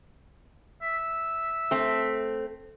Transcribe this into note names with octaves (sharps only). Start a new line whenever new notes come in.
E5
A3 C4